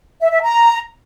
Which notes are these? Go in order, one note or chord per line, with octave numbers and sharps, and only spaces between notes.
E5
E5
A#5